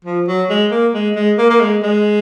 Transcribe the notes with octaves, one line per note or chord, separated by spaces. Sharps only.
F3
F#3
G#3
A#3
G#3
G#3
A#3
A#3
G#3
G#3